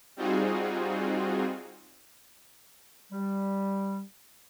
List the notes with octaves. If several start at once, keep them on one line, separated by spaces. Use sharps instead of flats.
G3 C4 D#4 F4 F#4 G#4
G3